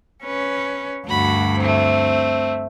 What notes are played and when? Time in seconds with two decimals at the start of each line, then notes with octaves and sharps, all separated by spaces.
0.25 C#4 B4
1.07 D2 G2 F#4 B5
1.58 A3 C4